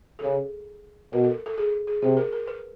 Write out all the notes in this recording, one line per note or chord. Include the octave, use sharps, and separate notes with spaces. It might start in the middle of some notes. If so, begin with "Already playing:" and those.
A4
C#3 G#4
B2 A#4
A4
A4
G#4
G#4
C3 G#4
A#4
A#4
B4